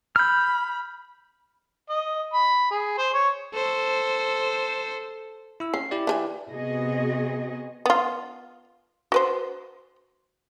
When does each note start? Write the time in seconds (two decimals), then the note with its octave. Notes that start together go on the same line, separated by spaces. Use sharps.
0.16 B5 F6 G6
1.89 D#5
2.33 B5
2.71 G#4
2.98 C5
3.13 C#5
3.54 A4 C5
5.60 E4 E6
5.74 C#4 C7
5.91 E4 G4 D5
6.07 E3 G#4 G#5
6.51 C3 B3 F#4 G#4 D#5
7.86 B3 F4
9.12 F#4 B4 C5